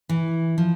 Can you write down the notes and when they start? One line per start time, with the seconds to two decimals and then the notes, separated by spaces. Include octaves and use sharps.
0.09 E3
0.58 F3